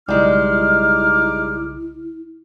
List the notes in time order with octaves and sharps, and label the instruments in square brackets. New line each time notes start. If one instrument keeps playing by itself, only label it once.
[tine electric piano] B1 C#3 [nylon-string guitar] G3 G#3 [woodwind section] D#4 D6 F6 [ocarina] E4